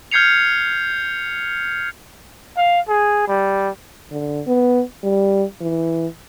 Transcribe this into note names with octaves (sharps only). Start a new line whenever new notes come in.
F6 G6 G#6 C7 C#7 F7
F5
G#4
G3
D3
B3
G3
E3